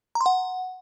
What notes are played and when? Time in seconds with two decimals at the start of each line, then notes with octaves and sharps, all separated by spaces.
0.15 A#5
0.21 C6
0.26 F#5